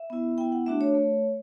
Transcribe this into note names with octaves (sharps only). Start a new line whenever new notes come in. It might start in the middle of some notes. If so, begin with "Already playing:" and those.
Already playing: E5
B3 E4
B3 E4 G5
F#5
A3 D4 F#4 E5
C#5
A3